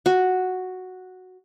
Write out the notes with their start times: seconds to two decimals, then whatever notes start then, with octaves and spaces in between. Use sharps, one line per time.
0.06 F#4